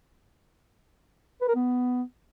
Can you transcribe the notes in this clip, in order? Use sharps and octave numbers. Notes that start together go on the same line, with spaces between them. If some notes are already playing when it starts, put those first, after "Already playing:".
B4
A#4
B3